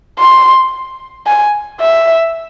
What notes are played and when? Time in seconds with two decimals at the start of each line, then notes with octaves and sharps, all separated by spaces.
0.19 C6
1.27 G#5
1.80 E5